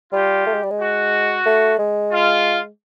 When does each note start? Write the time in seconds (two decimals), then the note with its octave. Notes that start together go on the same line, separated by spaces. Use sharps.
0.12 G3 F4 G4
0.46 A3
0.54 G#3
0.63 G3
0.71 G#3
0.79 F#4
1.46 A3
1.79 G#3
2.11 F4